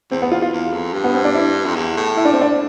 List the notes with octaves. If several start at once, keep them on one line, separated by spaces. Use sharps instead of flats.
E2 C4
B3
F4
F4
E2
F2
G2
B3
C4
D4
E4
F2
E2
A2
E4
D4
C4
D4